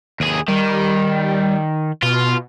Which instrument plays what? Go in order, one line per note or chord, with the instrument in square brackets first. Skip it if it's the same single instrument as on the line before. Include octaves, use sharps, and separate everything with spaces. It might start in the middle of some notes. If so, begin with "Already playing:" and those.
[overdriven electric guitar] D#2 G#4
[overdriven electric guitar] D#3 [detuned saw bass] G3
[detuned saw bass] B2 [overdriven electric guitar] F4